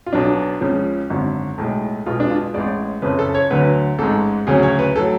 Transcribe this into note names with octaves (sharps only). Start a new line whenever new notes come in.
F4
B1 B2 F#3 D4
C#2 C#3 F3
G#1 F#2 D3
B1 A2 G#3
B1 B2 G#3 F4
D4
F4
A1 A2 G#3 D5
F#1 F2 C#3 B4
A4
C#5
D2 D3 F#3 B4
A1 G#2 G#3 A4
D2 C#3 F#3 G#4
C#5
B4
A2 F#3 A4